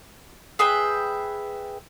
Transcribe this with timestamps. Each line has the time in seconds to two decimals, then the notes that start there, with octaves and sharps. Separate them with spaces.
0.59 G#4 B4 E5 G5